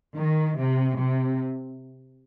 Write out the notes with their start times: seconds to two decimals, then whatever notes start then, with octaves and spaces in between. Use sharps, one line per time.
0.17 D#3
0.58 C3
0.98 C3